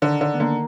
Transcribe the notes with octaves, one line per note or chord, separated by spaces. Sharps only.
D3 D#3
D3
B3
D3 A#3